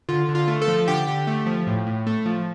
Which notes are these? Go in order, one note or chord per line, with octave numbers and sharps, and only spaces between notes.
D3 F4
D3
F4
A3
A4
F3
D3 G4
D3
A3
F3
A2
A2
A3
F3